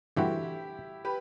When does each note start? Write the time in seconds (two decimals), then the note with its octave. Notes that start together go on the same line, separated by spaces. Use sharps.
0.16 G2 E3 A3 C4 E4 F#4 G4
1.05 G4 B4